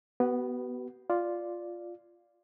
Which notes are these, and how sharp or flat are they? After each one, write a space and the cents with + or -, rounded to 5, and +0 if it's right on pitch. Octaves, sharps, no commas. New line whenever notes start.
B3 +0 F#4 +45 B4 +0
F4 +0 D5 +0